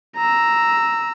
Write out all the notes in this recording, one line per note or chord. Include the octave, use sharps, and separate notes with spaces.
A#5 E6